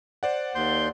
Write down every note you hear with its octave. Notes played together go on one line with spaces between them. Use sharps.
C5 D5 F#5
D#2 C6 G6